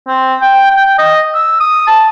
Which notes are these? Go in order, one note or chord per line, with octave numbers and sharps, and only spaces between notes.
C4
G5
G5
D#5
E6
D#6
A5